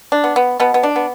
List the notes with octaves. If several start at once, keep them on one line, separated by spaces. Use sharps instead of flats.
D4
B3
B3
B2 B3
B3
D4
B3